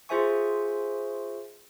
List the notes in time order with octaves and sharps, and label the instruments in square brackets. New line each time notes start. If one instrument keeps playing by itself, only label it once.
[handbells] F4 G#4 C5 E5 G#5 C#6